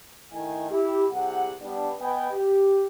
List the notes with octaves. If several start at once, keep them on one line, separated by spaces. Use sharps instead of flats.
D#3 A3 E4 D#5 G#5
E4 G4
C2 G4 G#4 F#5
G3 B3 D4
B3 B4 D#5 G5 G#5
G4